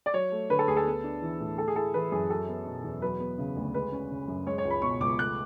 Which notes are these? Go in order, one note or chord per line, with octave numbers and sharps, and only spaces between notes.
D5
F#3 C#5
A3
D3 B4
A4
D2 G#4
A4
B3
D4
E3
A2
A3 A4
G#4
E4 A4
E3 B4
F#2 G#4
F#3 A4
B3
B2
E2
F#3 B4
B3
C#3
D2
G#3 B4
C#4
C#3
F#2
G#3 C#5
C#5
C#2
B5
B2 C#6
C#2 D6
A3 F#6